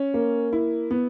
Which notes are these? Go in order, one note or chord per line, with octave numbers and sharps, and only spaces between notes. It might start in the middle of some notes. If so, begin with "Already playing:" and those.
Already playing: C#4
A#3
E4
B3